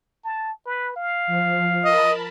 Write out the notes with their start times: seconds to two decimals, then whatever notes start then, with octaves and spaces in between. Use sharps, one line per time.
0.24 A5
0.66 B4
0.96 F5
1.27 F3
1.85 A#4 D#5 A5 B5